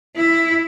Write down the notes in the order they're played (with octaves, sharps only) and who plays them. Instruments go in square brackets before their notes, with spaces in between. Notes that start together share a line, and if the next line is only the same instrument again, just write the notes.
[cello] E4